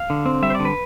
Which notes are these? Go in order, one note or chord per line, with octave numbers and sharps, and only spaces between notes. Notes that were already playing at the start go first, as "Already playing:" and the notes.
Already playing: F5
D3
C4
G3 E5
C5
D3 D5
B4